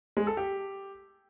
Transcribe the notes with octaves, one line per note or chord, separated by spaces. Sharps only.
G#3
A4
G4